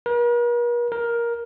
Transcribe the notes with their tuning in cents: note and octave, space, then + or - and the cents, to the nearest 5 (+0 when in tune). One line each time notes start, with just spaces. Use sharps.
A#4 +45
A#4 +10